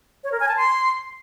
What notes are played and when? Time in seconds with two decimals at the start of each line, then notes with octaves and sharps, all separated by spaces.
0.24 C#5
0.32 A#4
0.40 G#5
0.48 A5
0.56 C6